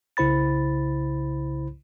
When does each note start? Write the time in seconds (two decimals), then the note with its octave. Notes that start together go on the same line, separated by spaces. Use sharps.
0.17 C2 C#3 E4 C5 B5 A6